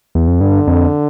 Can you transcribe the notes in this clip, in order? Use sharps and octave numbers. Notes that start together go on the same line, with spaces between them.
E2
F2
G2 D3
F2